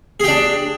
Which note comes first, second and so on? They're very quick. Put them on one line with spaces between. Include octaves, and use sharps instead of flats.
G#4 G4 D4